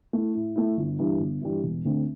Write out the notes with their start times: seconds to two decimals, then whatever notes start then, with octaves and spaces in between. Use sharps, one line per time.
0.13 A3 E4
0.35 A2
0.56 A3 E4
0.78 G1
0.99 G2 E3 G3
1.20 G1
1.42 G2 E3 G3
1.63 E1
1.85 D2 D3 A3 C4